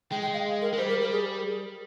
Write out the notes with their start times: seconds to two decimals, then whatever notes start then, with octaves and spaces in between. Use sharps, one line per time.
0.11 G#3 G5
0.22 G5
0.34 F5
0.62 A#4
0.73 G#3
0.78 G3 C5
0.89 A#4
1.01 A#4
1.12 G#4